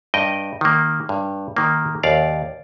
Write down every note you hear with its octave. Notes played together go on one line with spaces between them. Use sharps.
G2 D#5 G5
D#3 A#3
G2
D#3 A#3
D#2 D5 F5